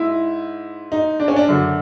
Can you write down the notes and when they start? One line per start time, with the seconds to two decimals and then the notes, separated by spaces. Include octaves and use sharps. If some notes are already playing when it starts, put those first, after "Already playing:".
Already playing: G#2 E4
0.92 D#4
1.20 D4
1.28 C#4
1.36 D4
1.48 F#2 D3 F#3